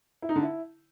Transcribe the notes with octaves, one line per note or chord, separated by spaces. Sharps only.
E4
D#4
D3
E4